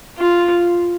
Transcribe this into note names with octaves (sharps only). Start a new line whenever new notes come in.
F4